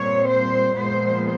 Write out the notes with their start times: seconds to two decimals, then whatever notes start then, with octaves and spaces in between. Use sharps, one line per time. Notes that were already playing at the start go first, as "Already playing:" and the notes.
Already playing: A#2 G3 C4 C#5
0.27 C5
0.78 A#2 F3 G#3 B3 C5